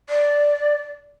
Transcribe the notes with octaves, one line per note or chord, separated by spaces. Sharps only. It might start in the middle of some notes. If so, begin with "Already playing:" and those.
D5